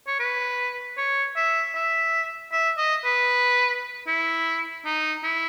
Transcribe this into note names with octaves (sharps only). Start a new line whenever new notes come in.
C#5
B4
C#5
E5
E5
E5
D#5
B4
E4
D#4
E4